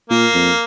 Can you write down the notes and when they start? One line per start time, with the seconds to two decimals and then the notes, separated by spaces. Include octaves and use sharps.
0.10 A#2 A#3
0.34 F2